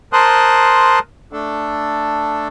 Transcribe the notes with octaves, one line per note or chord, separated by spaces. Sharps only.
A#4 C5 A5 C6 D#6 F#6
A3 D4 A4